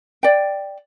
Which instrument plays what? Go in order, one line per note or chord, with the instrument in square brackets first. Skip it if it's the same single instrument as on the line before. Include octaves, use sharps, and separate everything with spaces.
[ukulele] D5 G5